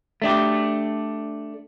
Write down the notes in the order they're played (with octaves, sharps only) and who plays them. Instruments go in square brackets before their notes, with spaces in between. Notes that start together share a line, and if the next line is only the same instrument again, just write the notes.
[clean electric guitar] A3 D4 G4